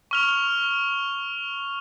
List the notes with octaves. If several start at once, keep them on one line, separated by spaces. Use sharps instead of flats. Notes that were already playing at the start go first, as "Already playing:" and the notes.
C#6 F6 F7